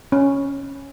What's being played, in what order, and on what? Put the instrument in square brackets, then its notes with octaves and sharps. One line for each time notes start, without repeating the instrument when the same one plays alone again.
[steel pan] C#4